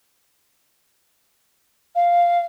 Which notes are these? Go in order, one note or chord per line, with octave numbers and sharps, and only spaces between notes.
F5